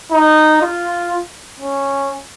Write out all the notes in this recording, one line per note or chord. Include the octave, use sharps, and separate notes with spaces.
D#4
F4
C#4